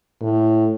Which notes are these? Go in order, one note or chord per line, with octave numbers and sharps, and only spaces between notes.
A2